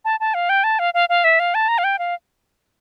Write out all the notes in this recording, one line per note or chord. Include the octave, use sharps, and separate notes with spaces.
A5
A5
F5
G5
A5
F5
F5
F5
E5
F5
A5
A#5
F5
G5
F5